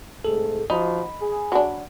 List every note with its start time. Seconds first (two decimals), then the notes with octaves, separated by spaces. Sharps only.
0.25 G#2 C3 A3 G#4 A4
0.70 F3 D#4 F#4 B5
1.20 G#4
1.52 F#3 D4